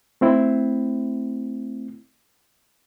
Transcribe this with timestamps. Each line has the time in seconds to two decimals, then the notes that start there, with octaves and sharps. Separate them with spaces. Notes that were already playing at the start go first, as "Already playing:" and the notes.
0.21 A3 C4 E4